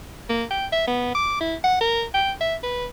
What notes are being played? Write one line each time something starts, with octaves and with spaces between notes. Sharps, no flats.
A#3
G5
E5
B3
D6
E4
F#5
A#4
G5
E5
B4